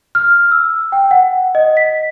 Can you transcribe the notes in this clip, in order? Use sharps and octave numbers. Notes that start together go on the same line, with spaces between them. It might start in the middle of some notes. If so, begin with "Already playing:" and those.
F6
E6
G5
F#5
D#5
B6